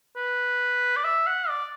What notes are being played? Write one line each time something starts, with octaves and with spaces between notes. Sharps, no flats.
B4
D5
E5
F#5
D5